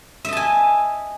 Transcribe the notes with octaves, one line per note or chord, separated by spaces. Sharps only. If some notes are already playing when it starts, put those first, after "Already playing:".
D#5 E5 G#5 A5